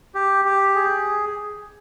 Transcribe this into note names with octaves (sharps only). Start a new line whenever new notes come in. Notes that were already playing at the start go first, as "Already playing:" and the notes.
G4
G4
G#4